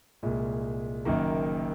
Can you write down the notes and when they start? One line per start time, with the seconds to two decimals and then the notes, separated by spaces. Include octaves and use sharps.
0.23 C2 A#2 G#3
1.05 F#1 F#2 D#3 A#3